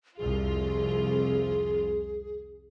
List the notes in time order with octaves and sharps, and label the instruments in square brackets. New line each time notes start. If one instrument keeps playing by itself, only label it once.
[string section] C2 F2 F4 [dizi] G#4